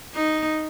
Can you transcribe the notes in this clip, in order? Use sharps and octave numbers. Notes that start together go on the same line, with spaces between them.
D#4